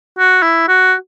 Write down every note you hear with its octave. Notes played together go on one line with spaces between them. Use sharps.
F#4
E4
F#4